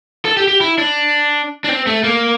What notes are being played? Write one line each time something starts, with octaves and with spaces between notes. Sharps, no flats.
A4
G4
G4
E4
D4
D4
C4
A3
A#3